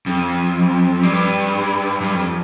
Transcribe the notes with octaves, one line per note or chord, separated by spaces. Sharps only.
F2
G2
G2
F2